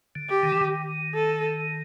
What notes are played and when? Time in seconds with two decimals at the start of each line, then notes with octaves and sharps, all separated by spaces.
0.15 D3
0.29 G4
0.43 D#3
0.52 E3
0.61 D#3
1.14 A4